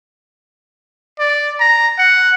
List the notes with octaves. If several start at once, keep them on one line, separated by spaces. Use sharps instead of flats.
D5
A#5
F#5